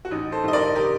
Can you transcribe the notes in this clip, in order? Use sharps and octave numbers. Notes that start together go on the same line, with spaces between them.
F#4
A1 D#4
A4 C5
G2 D#3 D#5
A#4 D5
G4 A#4